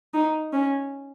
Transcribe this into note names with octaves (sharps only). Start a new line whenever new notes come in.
D#4
C#4